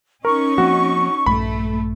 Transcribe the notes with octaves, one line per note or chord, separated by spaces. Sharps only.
C#4 D#4 A#4 C#6
F3 A#3 C4 F#4
A#1 G2 A3 B5